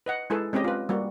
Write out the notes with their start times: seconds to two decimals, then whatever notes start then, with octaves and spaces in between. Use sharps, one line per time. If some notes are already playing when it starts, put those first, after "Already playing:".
0.06 B4 D#5 F#5
0.30 G#3 E4 G#4 A4 B4
0.53 G#3 C4 C#4 G4 D#5
0.64 F4 B4
0.89 G3 A#3 F#4